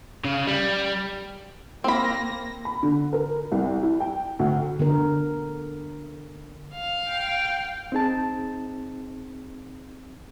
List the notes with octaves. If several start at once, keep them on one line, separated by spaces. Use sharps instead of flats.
C#3
G3
A#3 C4 B5 A#6
B5
D3
A#4
C2
E4
G5
D2
D3 B3 A#4
F5
G5
C4 D#4 G#4 A5